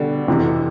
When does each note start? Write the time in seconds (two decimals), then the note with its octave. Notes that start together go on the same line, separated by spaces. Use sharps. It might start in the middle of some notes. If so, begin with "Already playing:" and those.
Already playing: B2 D3 G3
0.28 F2 C3 E3